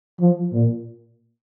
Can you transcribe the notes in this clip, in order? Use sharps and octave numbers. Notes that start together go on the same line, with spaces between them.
F3
A#2